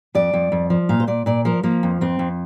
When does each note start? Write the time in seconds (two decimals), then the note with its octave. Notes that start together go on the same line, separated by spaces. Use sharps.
0.15 F2 D5
0.34 F2
0.52 F2
0.70 F3
0.89 A#2 F5
1.00 C5
1.07 A#2 D5
1.26 A#2 D5
1.45 F3 A#4
1.63 F3 A#3
1.83 F2
2.01 F2 C4
2.19 F2